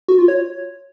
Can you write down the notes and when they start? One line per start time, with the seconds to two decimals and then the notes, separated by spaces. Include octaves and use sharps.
0.08 F#4
0.18 F4
0.28 C#5